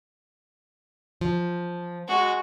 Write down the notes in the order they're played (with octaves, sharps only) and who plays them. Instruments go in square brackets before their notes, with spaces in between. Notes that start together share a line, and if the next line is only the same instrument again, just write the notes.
[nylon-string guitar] F3
[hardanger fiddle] G#3 F#4